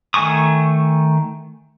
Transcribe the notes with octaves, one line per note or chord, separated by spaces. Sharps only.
D#3 A3 G#5 C#6 D#6